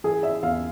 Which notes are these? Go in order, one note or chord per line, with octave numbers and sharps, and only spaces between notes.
E3 G#4
E5
E2 F5